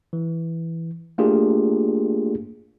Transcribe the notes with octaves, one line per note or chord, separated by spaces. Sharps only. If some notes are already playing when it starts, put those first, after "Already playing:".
E3
A3 A#3 D4 F4 G4 G#4